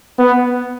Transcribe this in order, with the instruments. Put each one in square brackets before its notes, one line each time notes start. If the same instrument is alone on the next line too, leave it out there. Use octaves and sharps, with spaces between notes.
[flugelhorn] B3